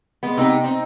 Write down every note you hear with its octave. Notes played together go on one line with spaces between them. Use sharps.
G#3 B3
C3 D#4 G4
C4 D#4